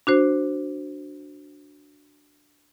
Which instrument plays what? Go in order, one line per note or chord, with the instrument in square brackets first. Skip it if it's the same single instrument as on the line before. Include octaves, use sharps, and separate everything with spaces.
[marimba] D4 F#4 C5